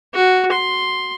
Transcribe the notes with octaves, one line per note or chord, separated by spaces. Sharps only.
F#4
C6